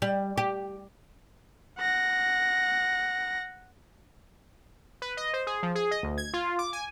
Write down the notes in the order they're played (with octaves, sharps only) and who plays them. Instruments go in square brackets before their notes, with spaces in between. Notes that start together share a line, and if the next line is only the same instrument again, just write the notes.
[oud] G3
G4
[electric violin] F#5 A#6
[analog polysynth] B4
D#5
C5
G#4
F3
G#4
D#5
D2
G#6
F4
D6
G#5